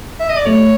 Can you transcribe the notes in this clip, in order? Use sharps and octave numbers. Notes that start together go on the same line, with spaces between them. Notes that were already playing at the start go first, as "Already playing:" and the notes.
E5
D#5
D5
A3 C#5